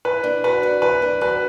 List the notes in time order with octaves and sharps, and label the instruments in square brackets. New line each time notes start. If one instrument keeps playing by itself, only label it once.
[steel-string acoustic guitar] E3 [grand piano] B4
[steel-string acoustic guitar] D4
[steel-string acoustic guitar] F#4 [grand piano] B4
[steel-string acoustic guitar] D5
[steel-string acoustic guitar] E3 [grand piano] B4
[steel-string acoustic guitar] D4
[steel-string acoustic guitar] F#4 [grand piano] B4